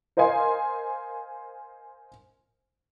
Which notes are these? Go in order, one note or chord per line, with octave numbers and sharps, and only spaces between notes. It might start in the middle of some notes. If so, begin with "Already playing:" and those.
A#4 C5 D#5 F5 G#5 C6